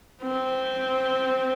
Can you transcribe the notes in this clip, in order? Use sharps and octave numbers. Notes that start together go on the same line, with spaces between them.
C4